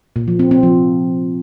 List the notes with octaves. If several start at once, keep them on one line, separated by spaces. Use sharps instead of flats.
A#2
F3
C4
C4
F3